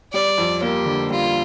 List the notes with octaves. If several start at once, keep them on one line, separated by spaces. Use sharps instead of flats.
G3 D5
F2
A#3 G4
D3
G3 F4